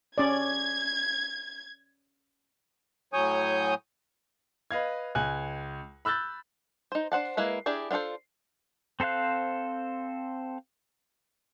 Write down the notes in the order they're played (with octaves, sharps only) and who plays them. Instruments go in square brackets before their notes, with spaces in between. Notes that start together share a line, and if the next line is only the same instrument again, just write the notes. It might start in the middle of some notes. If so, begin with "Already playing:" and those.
[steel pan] C#4 D5 [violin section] G#6
[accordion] A2 F#3 C#5 G#5 D#6 G6
[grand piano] B4 D#5 F5 G#6
C#2 G#5 F#6
B5 E6 F#6 G6 A6
[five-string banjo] D#4 C5
D4 C5 F#5 A5
G#3 A#3 E4 B4
D4 E4 G4 G#4 D5
B3 D4 F4 A4 C5
[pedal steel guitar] C4 A4 C5 F5 F#6